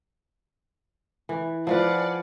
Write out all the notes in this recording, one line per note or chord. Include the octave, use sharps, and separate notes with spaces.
E3
F3 F4 G#4 B4 D5 F#5